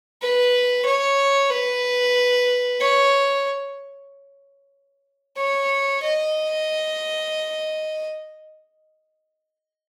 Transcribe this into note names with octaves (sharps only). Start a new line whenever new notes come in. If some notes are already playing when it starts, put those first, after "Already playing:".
B4
C#5
B4
C#5
C#5
D#5